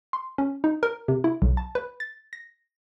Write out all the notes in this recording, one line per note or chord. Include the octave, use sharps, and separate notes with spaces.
C6
C#4
D#4
A#4
C3
E4
B1
A5
B4
A6
A#6